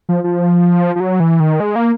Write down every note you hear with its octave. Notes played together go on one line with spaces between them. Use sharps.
F3
F3
F3
F#3
E3
D#3
G#3
A#3